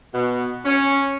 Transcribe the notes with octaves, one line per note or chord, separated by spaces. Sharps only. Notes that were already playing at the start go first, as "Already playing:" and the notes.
B2
C#4